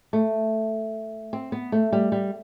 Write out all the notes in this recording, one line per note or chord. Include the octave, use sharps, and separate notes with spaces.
A3
C4
B3
A3
G3
G3